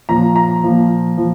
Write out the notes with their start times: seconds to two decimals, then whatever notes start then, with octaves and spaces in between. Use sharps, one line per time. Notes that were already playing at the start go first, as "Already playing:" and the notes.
0.09 A#2 F3 A#5
0.36 A#5
0.63 A#2 F3
1.17 F3